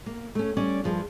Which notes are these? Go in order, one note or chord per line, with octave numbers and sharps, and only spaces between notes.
A#3
A3 C#4
G3 C#4 D5
G2 F3 G#4